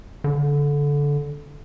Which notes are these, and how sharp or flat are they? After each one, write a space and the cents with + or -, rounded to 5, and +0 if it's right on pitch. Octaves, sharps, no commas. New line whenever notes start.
D3 -20